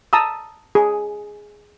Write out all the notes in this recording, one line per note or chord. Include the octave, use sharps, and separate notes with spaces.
A5 A#5 D#6 E6
G#4